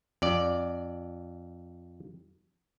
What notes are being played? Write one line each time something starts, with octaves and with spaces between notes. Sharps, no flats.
F2 D5